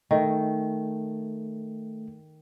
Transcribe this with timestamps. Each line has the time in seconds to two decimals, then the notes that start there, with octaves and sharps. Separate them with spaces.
0.11 D#3 A3